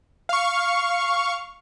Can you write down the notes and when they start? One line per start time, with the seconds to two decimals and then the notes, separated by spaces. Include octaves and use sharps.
0.29 F5 C#6